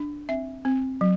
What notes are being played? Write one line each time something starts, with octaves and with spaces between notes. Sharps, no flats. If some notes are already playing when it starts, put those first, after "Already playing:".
Already playing: D4
C4 E5
C4
F#3